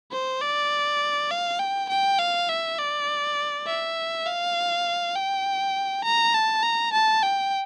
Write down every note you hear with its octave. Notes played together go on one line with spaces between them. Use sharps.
C5
D5
F5
G5
G5
F5
E5
D5
E5
F5
G5
A#5
A5
A#5
A5
G5